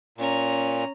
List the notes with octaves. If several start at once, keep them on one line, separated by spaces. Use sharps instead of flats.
A#2 C#4 A#5